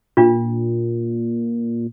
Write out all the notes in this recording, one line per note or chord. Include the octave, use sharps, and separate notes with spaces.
A#2 D4 F4